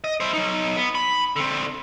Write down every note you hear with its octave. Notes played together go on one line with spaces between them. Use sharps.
D#5
E4 C5
F#3 D#4
B3
B5
D3 C4